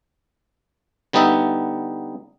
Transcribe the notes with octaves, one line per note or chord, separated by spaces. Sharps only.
D3 G3 B3 D#4 D#5 E5